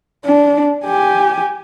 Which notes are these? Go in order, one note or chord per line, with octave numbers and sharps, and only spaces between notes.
D4
G4 G#5